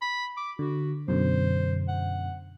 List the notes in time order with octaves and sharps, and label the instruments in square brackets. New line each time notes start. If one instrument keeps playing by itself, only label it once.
[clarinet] B5
D6
[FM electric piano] D3 [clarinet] F#4
[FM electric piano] F#2 B2 D3 [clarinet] C5
[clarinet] F#5